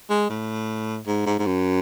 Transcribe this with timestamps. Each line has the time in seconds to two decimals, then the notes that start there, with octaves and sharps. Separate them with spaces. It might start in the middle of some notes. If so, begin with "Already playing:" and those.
0.10 G#3
0.29 A2
1.07 G#2
1.26 G#2
1.39 G#2
1.46 F#2